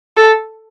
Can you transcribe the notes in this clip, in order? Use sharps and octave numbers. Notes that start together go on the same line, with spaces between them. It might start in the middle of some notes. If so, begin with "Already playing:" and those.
A4